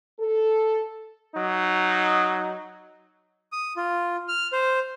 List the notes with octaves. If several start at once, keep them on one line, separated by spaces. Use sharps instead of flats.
A4
F#3 D#4
D#6
F4
F6
C5